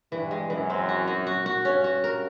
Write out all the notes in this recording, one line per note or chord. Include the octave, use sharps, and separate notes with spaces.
G2 E3
G#3
F#2 E3
C4
F#4
F#4
F#4
F#4
G2 C#4
F#4
A#4